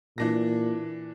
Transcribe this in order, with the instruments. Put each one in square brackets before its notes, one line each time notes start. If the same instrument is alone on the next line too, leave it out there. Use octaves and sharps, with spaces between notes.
[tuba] A#2 [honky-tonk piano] E3 D4 A#6